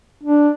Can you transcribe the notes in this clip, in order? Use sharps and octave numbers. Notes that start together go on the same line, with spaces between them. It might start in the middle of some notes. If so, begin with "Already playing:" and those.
D4